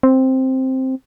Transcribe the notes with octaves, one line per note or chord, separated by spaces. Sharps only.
C4